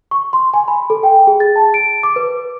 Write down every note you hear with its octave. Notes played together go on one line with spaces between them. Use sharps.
C#6
C6
G#5
B5
A4
G5
G#4
A6
A5
D7
D6
B4